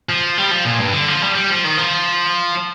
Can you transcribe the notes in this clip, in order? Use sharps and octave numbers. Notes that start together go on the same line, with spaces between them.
F3
G3
F3
A#2
G2
D3
F3
G3
G3
F3
D#3
F3